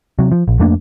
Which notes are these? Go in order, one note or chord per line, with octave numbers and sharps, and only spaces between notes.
C3 F#3
F3
A#1
F2 A3 A#3 D4